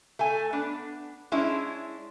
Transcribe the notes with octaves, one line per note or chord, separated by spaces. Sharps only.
A3 A4 G#5
B3 D4
G#3 C#4 D4 E4